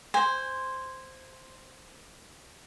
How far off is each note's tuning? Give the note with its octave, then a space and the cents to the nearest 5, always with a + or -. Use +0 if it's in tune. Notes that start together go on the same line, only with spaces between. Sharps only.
C5 +0 G#5 -20